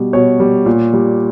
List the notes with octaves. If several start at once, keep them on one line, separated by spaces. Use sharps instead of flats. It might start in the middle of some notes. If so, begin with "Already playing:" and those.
Already playing: B2 G3
B2 C#5
G3
A#2
G3